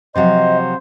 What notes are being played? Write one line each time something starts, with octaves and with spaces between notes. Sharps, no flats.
C3 F3 F#3 C5 D#5